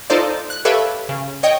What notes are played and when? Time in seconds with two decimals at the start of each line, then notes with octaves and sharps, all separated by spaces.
0.10 D#4 F4 A4 C5 D5
0.50 F#6
0.65 G4 A4 B4 C#5 E5 F5
1.09 C#3
1.43 C#5 D#5 G5